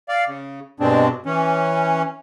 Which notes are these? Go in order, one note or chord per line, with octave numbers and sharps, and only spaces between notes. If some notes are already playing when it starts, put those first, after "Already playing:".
D5 F5
C#3
G2 B2 G#3 C4 D4
E3 C#4